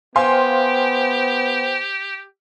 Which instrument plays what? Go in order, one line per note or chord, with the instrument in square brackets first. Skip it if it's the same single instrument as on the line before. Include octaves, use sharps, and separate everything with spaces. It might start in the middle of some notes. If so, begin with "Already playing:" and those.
[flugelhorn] B3 [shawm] G4 [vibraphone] C5 G5 [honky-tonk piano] F5 G#5 C6